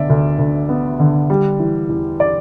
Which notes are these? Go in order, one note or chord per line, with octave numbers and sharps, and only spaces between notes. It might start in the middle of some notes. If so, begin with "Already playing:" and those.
Already playing: D3 B3 D5 E5
D2
D2
B3
D3
G3
E3
E2
D5